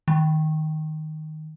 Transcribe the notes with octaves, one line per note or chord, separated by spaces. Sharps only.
D#3